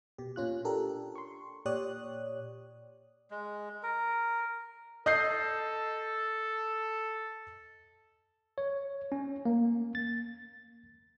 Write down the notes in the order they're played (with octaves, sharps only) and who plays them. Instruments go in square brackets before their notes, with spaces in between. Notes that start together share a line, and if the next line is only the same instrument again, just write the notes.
[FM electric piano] B2 G4
A#2 C#4 F4 F#6
D4 G4 A4 A#4
C6 C#6
A#2 G4 C#5 D5 D#6 F#6
[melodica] G#3
A#4
[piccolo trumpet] A4 [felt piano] D#5 G6 C7
[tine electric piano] C#5
C#4
A#3
A6